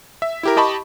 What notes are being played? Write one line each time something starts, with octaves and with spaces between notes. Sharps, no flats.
E5
E4 G4 A#4
G4 D#5 A5 B5 C#6